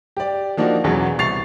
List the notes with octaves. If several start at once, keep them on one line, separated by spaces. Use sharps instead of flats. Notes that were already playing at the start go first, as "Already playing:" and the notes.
G4 D5
F3 A#3 D4 D#4 F#4
B1 E2 C#3 E3 F#3
C2 C#6 A6 C7 F7